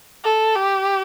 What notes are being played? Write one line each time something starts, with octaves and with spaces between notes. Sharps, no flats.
A4
G4